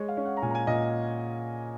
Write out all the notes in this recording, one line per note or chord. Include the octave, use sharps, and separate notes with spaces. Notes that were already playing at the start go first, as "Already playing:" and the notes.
Already playing: G#3 C#5
F5
C#4
F#5
A#5
A#2 G#5
A#5
G#5
A#2 D#5